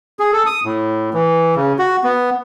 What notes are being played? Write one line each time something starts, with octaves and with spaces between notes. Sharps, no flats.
G#4
A4
D#6
A2
E3
C#3
F#4
B3